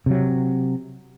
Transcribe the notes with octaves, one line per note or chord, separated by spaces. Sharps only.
C3 F#3